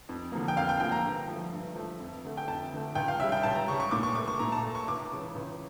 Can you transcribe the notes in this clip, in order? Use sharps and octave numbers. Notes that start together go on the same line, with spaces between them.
F2
D3 F3 A#3
G5
F2 F5
G5
D3 F3 A#3 G5
A#5
G2
F3 A3
G2
F3 A3
F2
D3 A3
G5
F2 A5
D3 A3
C#2 G5
F5
C#3 G3 E5
G5
C#2 A5
A#5
C#3 G3 C#6
C#6
A#2 D6
C#6
A3 D6
C#6
A#2 A#5
A5
A3
C#6
C#2 D6
C#3 E3
C#2